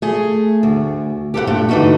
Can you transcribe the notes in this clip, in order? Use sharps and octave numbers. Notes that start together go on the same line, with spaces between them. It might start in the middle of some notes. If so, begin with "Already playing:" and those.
A3 G#4
D2
G4 A4 B4 F#5
G2 A#2 A3
D3 E3 A3 D#4 F#4